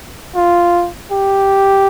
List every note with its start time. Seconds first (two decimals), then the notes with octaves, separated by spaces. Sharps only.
0.35 F4
1.12 G4